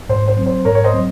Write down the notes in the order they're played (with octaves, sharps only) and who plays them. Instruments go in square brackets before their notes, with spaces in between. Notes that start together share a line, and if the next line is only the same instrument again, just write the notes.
[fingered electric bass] G#2 [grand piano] C5
[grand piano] C5
[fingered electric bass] F#3 C4
[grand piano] C5
[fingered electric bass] G#2 [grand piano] A#4 C#5
[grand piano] C#5
C5 D#5
[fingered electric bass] F#3 C4